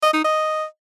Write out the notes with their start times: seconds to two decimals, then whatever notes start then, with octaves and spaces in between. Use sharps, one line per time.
0.03 D#5
0.14 D#4
0.25 D#5